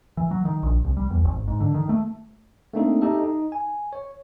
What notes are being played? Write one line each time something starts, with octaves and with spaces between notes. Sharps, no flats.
E3
F#3
D#3
A#1
C2
G3
E2
G#1
G#2
D3
D#3
A3
A3 A#3 C4 D4 D#4 A4
D#4 G4 A4 E5
D#4
G#5
C#5